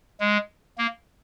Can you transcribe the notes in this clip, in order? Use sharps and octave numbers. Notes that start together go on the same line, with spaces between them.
G#3
A#3